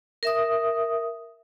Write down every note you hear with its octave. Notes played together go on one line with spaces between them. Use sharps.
A#4 E5 D#6